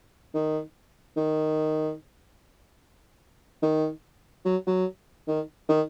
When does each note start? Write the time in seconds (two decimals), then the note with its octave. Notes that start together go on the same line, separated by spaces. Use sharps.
0.34 D#3
1.17 D#3
3.63 D#3
4.45 F#3
4.67 F#3
5.27 D#3
5.69 D#3